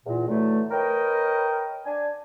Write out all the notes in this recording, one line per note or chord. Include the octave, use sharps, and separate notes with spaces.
E2 A#2
D3 E3 F#3 A3
A#4 B4 C#5 D#5 G5
D4 G#5